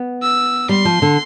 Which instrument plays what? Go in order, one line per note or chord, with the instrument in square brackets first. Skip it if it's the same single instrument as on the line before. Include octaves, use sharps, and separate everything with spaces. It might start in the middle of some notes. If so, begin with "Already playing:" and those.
Already playing: [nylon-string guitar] B3
[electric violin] E6
[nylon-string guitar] G3 [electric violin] C6
[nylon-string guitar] F3
D3